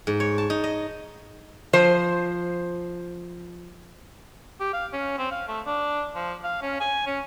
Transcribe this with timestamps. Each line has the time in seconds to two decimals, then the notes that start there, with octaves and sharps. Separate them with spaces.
0.07 G#2
0.20 C#5
0.38 A5
0.50 D#4
0.64 D#5
1.73 F3 C5
4.60 G4
4.73 F5
4.93 C#4
5.18 C4
5.32 F5
5.48 A3
5.66 D4
6.16 F3
6.44 F5
6.62 C#4
6.81 G#5
7.07 C#4